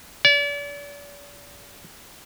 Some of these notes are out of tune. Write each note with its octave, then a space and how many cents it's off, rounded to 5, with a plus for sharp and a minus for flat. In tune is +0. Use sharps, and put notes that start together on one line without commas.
D5 -40